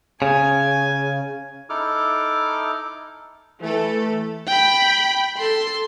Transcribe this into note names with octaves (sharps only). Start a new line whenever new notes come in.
C#3 G#5
D#4 E4 A4 D6 F6
E3 A3 A4
G5 B5
A4 C6